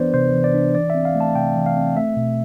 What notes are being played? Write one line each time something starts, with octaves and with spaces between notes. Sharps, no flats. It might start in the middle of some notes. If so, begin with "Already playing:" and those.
Already playing: E3 B3 D4 B4 C5 D5
C3 C5
E3
D5
D4
E3 D5
C4 E5
F5
A3
A5
C3 G5
E3
F5
C4
A3 E5
B2